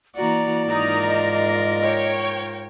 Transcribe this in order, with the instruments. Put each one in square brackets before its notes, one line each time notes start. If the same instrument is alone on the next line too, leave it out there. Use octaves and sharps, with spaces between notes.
[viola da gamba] E3 A#3 F#4 [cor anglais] D5 [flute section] A#5
[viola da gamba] G#2 F4 A#4 [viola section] D#3 D#4 A#5 [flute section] D#6
[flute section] D#5
[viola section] C#5 G5